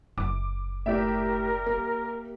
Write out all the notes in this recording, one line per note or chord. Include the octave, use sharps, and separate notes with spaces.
F#1 D6
A2 G4 A#4 D5 E5
A#3